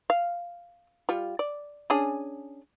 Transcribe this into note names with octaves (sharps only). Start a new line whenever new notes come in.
F5
G3 F4
D5
C#4 D4 G#4